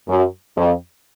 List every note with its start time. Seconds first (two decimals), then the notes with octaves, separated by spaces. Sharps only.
0.08 F#2
0.56 F2